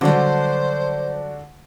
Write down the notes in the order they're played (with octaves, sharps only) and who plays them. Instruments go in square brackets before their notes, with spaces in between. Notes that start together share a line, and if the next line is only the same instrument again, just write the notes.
[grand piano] D3 D4 F#4 [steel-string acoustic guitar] F#3 G3 [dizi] C5